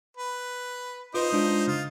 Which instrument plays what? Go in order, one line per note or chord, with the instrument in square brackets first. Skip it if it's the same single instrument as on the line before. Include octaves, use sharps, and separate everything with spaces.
[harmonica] B4
[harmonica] D#4 C5 D#5 [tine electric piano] F4 B4
[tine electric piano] G#3 D4 F4
[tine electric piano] C#3 [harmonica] F4